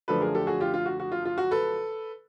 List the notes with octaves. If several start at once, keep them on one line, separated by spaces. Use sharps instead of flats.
F#2 D3 F3 A3 D4 A4 B4
G#4 A#4
G4 A4
F#4 G#4
F4 G4
F4
F#4
F#4
F4
F4
F#4
A4 B4